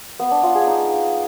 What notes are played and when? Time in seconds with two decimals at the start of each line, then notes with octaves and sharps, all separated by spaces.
0.20 B3
0.31 D4
0.43 F4
0.55 G#4
0.67 D#4